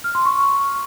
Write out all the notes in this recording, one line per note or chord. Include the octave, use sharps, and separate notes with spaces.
F6
C6
C#6